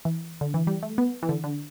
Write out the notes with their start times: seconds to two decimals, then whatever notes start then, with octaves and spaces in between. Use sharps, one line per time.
0.05 E3
0.41 D3
0.54 E3
0.67 G3
0.83 A3
0.98 B3
1.23 E3
1.29 D3
1.44 D3